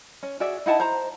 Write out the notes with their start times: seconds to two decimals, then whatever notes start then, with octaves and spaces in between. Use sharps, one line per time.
0.23 C#4
0.40 F#4 G#4 D5 E5
0.66 D#4 E4 F#5 A5
0.80 C5 A#5